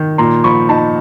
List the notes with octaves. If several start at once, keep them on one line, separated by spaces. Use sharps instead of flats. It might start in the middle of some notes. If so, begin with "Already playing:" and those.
Already playing: D#3
A#2 A#5 C6
F3 B5 C#6
D#4 A5 B5